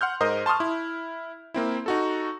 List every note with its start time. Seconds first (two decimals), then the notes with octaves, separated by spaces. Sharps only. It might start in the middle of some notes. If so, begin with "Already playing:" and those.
0.01 F#5 C6 F6 G6
0.21 G#2 A#4 C5 D#5 D#6
0.46 A5 C6 C#6 D#6 F6
0.60 E4
1.54 A#3 C4 E4
1.86 D#4 F#4 A4